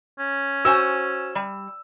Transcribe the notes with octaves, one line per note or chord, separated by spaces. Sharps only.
C#4
F#4 C5 G#5 E6
G3